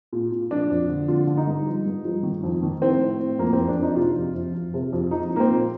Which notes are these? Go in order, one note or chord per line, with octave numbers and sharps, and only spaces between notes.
A#2
A#2
F3 D4
F2
D3
D3 F4
D3
D#4
G2
F3
G2
F3
D#3
F2
D#3
A2 C4
A2
A2
F2 A#3
C4
F2
D4
F2
D#4
C3 F4
F2
F2
F2
C3
F2
F3 D#4
F3
A#3
C4
A#2